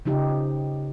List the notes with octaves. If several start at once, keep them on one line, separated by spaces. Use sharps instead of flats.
C#3 F3 D#4 G4